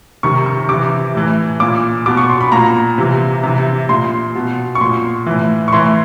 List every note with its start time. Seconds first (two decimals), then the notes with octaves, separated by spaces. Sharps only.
0.23 C3 D#3 C#6
0.46 C#6
0.69 C3 E3 D6
1.15 A2 E3
1.60 A#2 D6
2.06 B2 D6
2.17 C#6
2.29 C6
2.41 B5
2.52 A#2 A#5
2.98 C3 E3
3.43 C3 E3
3.89 A#2 C6
4.35 B2
4.75 C#6
4.81 A#2 C6
5.26 A2 E3
5.68 C#6
5.72 A2 E3 C6